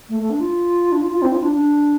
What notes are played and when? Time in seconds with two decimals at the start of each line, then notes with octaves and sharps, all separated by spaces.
0.09 A3
0.20 A3
0.30 D4
0.40 F4
0.92 D4
1.02 F4
1.12 F4
1.22 C4
1.32 F4
1.43 D4
1.53 D4